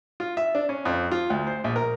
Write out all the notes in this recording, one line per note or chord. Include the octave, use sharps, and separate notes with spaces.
F4
E5
D4
C#4
F2
F4
D2
C5
A#1
A#4